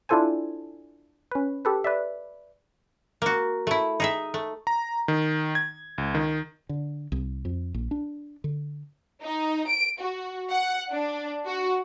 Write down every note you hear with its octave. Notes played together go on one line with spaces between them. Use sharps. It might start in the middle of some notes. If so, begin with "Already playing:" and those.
D4 E4 F4 A4 C5 G#5
C#4 B4
G4 A4 B4
B4 D5 E5
A#3 F#4
A3 E4
D#4 G#4 E5
A3
A#5
D#3
G#6
C#2
D#3
D3
C2
F2
A#1
D4
D3
D#4
D7
F#4
F#5
D4
F#4